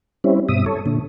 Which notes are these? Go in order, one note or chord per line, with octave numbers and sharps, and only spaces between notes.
G3 C4 C#4 E4
G2 B2 E5 D#6
A4 C#5
A#2 D3